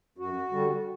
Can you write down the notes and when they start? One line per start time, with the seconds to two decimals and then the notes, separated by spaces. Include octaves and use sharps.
0.18 F#2 F#4
0.52 D3 G3